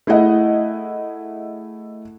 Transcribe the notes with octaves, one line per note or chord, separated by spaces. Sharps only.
A3 E4 G#4 D#5 F#5